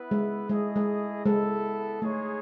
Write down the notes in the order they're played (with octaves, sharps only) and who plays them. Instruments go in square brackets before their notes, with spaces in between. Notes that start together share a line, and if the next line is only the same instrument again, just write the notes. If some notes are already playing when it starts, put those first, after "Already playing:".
Already playing: [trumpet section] B3 E4 B4 E5
[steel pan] G#3
[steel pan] G#3 [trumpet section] A3 E4 G#4 D#5
[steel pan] G#3
[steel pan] G#3 [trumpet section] B3 E4 A4
[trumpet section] G#3 D#4 G#4 C#5 [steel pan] A3